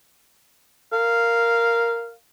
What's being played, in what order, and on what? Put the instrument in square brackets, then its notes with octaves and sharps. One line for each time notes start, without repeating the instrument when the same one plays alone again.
[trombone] A#4 [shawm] F5